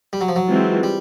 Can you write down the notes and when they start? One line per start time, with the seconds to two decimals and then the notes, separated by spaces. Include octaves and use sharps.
0.13 G3
0.21 F#3
0.29 F3
0.36 F#3
0.48 E3 G#3 C4 F4
0.83 G3